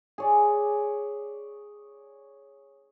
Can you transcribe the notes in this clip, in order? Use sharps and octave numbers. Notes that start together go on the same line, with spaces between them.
G#4 C#5 D5